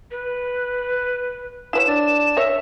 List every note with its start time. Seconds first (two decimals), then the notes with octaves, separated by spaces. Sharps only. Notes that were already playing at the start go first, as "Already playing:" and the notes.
0.11 B4
1.73 E4 B4 C#5 E7
1.87 D4
2.37 A#4 C#5 E5